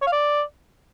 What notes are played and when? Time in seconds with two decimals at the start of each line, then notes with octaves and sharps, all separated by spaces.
0.02 C#5
0.07 F5
0.12 D5